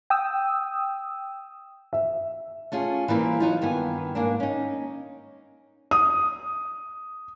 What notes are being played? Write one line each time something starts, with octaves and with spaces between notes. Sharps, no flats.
G5 D#6 E6
E5
A3 C#4 F4 G#4
E3 G3 A#3 C4
F#3 D#4 F4
G2 D#3 B3 G#5
G#2 A#3 D4
C#4 D#4
D#6